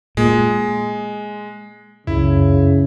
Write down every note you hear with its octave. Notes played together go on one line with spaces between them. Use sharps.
A#2 G#3
C#2 F#2 C#3 E4